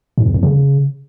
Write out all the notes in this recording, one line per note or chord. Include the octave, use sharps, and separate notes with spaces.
G#2
E2
F2
C#3